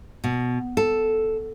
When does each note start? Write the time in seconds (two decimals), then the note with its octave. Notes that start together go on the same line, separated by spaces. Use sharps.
0.24 B2
0.77 A4